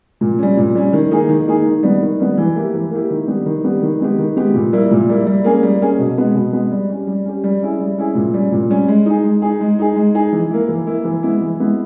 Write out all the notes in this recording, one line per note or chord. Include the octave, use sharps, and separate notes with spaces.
A#2
G3 C#4
A#2
G3 C#4
D#3
A#3 D#4 G#4
D#3
A#3 D#4 G#4
D#3
G3 B3
D#3
G3 B3
E3
A#3 E4 G4
E3
A#3 E4 G4
D#3
G3 B3 G4
D#3
G3 B3 G4
D#3
G#3 B3 G4
D#3
G#3 B3 G4
A#2
G3 A#3 E4
A#2
G3 A#3 E4
G3
A#3 C#4 G#4
G3
A#3 C#4 G#4
B2
G#3 B3
B2
G#3 B3
G3
C#4 G4
G3
C#4 G4
G3
C#4 E4 G#4
G3
C#4 E4 G#4
A#2
G3 C#4
A#2
G3 C#4
G#3
D#4 G#4
G#3
D#4 G#4
G#3
D#4 G#4
G#3
D#4 G#4
E3
A#3 E4
E3
A#3 E4
E3
G#3 B3 E4
E3
G#3 B3 E4